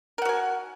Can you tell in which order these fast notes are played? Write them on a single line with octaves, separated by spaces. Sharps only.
A#4 F#5 F#4 G#5